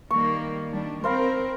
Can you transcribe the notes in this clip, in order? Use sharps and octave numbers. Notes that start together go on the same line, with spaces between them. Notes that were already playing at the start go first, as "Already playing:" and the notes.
D#3 G3 A#3 C#6
D#3 G3 D4
C4 A#4 C5 F5 B5